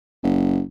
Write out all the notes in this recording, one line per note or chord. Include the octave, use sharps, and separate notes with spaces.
F#1